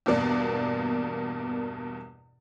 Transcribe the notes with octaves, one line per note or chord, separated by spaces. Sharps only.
E2 G2 B2 A#3 D5